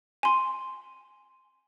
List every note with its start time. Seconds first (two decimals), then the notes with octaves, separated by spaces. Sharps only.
0.23 G#5 C6